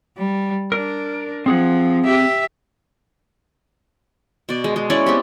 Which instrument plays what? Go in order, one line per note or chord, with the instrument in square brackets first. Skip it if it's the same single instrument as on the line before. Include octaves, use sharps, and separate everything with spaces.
[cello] G3
[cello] D4 [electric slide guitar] A#4
[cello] F3 [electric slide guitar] C4 G#4 F#5
[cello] G4 E5
[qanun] B2 D5
G#3
G#3
C#4 E4 D5 C#6
B3 C4 G4